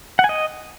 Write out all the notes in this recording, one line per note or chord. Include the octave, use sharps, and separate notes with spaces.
F#5
G#5
D#5